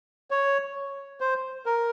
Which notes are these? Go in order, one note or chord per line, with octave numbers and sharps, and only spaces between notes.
C#5
C5
A#4